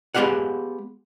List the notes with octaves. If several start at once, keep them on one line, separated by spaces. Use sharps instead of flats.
G#3 B3 C#4 G4 F5 F#5